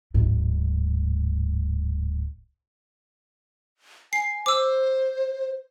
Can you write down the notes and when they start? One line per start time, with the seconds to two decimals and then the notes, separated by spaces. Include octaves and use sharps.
0.14 D1 G#2
4.13 G#5 C7
4.46 C5 D6 E6